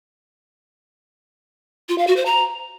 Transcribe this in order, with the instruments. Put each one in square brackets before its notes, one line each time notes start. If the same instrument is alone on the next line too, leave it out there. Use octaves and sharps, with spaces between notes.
[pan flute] F4
F5
F#4
C5
A#5